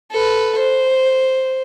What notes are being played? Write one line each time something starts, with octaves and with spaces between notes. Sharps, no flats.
A4 B4
C5